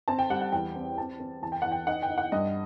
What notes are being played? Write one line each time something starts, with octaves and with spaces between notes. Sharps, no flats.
C4 A5
G5
G3 F#5
F#5
E2 G5
C4
C4 A5
C4
E2 A5
G5
E2 F#5
G5
D#4 F#5
G5
D#4
F#5
G2 D#5